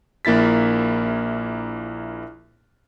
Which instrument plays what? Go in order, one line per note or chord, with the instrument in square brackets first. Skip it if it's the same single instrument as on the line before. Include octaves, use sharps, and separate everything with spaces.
[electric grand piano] A#1 A#3 E4 A6 B6